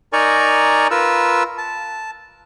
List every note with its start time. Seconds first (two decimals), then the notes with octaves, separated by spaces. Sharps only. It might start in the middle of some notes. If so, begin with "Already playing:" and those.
0.13 D#4 A#4 D5 G#5 A#5 C#6
0.91 F4 A#4 B4 E6
1.58 A5